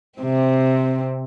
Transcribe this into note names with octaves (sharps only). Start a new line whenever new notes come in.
C3 C4